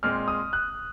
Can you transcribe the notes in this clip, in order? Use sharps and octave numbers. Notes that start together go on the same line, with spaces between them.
A#2 G#3 C4 F6
D#6
F#6